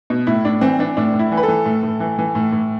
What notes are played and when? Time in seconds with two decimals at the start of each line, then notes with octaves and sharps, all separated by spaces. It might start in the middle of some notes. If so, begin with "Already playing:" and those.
0.10 B2
0.27 A2 E4
0.45 A2 D4
0.61 E3 C4
0.79 E3 D4
0.97 A2 D4
1.14 A2
1.19 E4
1.32 E3
1.37 B4
1.43 A4
1.48 E3
1.65 A2
1.83 A2
2.00 E3
2.19 E3
2.35 A2
2.52 A2